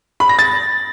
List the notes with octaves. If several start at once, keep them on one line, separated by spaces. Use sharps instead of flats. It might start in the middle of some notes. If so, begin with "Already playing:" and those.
B5
A#6
A6